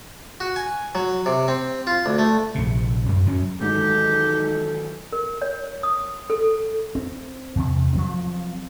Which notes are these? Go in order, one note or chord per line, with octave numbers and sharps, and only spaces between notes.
F#4
G#5
F#3
C3
C4
F4
D2
A3
A#1 C3
F#2
F#2 F#3 C#4
G#2 D#3 E3 F#3 G4 A4
A#4
C#5
D#6
A4
C4
E2 C3
F3 F#3 C4